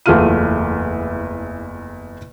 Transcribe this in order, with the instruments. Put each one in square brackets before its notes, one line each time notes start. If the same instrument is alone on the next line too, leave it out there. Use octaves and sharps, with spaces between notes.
[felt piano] F#1 E2 A3 F4 F6 D#7